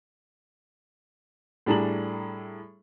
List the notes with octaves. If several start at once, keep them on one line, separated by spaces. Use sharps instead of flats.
A2 G3 D4 G#4 A#5 F#7